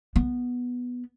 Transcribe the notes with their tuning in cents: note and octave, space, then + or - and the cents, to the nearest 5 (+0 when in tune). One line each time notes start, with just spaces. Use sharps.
B3 -5